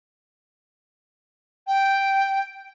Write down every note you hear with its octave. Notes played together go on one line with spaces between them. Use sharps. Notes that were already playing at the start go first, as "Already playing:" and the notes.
G5